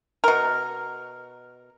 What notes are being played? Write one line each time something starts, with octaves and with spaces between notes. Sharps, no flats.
B2 A#4